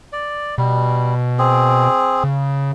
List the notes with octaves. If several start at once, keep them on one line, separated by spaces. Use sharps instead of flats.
D5
B2 G3
C4 G#4
C#3